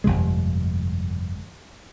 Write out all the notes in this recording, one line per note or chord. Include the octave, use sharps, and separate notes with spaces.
G1 F2 C3 G#3